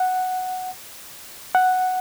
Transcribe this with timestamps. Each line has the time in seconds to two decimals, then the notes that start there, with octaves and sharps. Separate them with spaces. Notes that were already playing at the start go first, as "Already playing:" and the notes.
Already playing: F#5
1.55 F#5